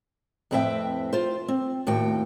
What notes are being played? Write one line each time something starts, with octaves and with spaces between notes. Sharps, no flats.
F2 A2 C4 B4 E5 G5
F4 C5
C4
D#2 A2 F#4 G5